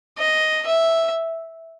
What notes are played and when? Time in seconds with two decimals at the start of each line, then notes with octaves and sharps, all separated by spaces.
0.18 D#5
0.67 E5